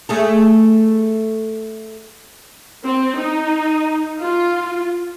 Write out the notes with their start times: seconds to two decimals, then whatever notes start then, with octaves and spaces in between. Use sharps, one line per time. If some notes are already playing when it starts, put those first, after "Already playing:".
0.09 A3 G#4 A4
2.85 C4
3.18 D#4
4.22 F4